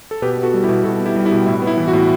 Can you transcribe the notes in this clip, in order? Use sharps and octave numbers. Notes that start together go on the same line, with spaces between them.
A4
B2 G4 B4
B3
F#4 A4
G3
E4 G4
B2
B2 F#4 A4
B3
E4 G4
G3
E4 G4
B2
A2 E4
B3
E4
E3
F#4
A2